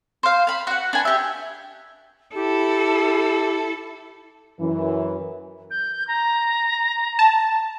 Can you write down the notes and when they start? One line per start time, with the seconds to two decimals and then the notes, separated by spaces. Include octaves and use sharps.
0.23 C5 F5
0.47 F5 B5
0.67 F#4 F#5
0.93 D4 B4 G#5
1.05 G4 E5
2.35 E4 G4 A4
4.60 F#2 E3
5.70 G6
6.07 A#5
7.19 A5